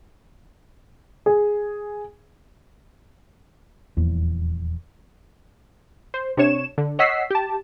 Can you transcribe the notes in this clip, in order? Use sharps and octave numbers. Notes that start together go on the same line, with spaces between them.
G#4
D#1 E2 F3 A#3
C5
C3 D4 C#5 E7
D3
C#5 D#5 F#5 E6 B6 C7
G4 A5